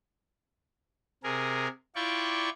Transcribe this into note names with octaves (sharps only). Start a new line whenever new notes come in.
C3 G#4 A#4
E4 F4 D5 G5 C#6